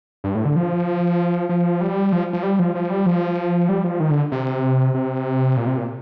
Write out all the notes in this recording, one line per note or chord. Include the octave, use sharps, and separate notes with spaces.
G2
A2
D3
F3
F3
G3
F3
F3
G3
F3
F3
G3
F3
G3
F3
D#3
D3
C3
C3
A#2
C3
A#2